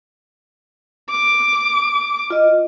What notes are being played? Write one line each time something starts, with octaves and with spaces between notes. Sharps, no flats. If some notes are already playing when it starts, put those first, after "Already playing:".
D6
F4 D#5